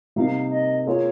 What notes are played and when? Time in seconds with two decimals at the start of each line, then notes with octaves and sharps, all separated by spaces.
0.16 C3 G3 A#3 D#4 A#4 F5
0.52 D#5
0.87 A#3 F4 G#4 C#5